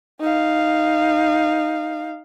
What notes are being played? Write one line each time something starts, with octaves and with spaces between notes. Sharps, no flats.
D#4 F5